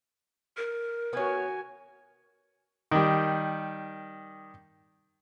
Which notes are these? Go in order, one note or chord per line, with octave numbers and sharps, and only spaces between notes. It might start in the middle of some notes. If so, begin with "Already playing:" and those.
A#4
B3 F#4 C#5 G#5
D#3 G3